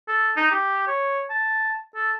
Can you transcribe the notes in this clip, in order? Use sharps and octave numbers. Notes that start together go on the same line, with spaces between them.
A4
D#4
G4
C#5
A5
A4